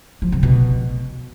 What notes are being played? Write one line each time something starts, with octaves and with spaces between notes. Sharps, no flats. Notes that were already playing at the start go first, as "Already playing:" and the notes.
F3
C3
B2